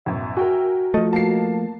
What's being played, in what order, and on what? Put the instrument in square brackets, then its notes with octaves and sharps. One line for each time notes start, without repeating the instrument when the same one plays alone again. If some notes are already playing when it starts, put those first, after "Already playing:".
[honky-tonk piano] A1 F#2 B2 [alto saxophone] E5
[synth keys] F#4 [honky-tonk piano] A#4 G5 G#5
[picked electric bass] F3 A3 [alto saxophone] D#5
[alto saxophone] A#3 [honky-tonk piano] A5 C7